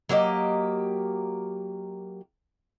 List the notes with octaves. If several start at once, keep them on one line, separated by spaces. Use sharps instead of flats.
F#3 A#3 G4 D#5